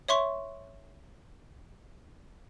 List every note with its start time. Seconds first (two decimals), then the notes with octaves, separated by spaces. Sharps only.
0.08 C#5 E5 C6 C#6